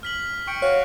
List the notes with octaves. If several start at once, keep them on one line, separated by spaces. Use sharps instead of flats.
F6 B6 F#7
G5 C#6 C#7 D7
F#4 C#5 F5 F#6